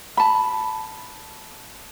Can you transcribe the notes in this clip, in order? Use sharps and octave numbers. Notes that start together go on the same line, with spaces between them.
A5 B5